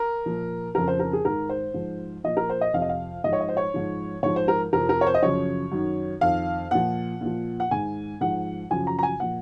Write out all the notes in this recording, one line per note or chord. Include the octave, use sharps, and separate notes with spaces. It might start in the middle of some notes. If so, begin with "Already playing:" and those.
Already playing: A#4
A#2 F3
F2 C#3 F3 A#4
C5
A#4
G#4
G#2 D#3 A#4
C5
G#2 F3
A#2 F3 D#5
A#4
C5
D#5
F2 C3 F3 F5
D#5
F5
G#2 F3 D#5
C#5
D#5
C5
C#5
G#2 F3
G#2 F3 C#5
C5
A#4
F2 C3 F3 A#4
A#4
C#5
C5
D#5
F#2 C#3 F3 C#5
F#2 D#3
F2 D#3 F5
A#2 F3 F#5
A#2 F3
F#5
G#2 D#3 G#5
G#2 F3 F#5
F#2 C#3 F3 G#5
A#5
A#5
G#5
A#2 F3 F#5